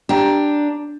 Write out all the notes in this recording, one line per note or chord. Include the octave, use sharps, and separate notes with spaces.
D4 G4 A#5